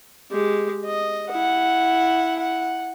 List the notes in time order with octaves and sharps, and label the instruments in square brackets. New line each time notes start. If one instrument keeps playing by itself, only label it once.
[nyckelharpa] G#3 G4
D#5
[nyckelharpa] E4 [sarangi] F#5
[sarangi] F#5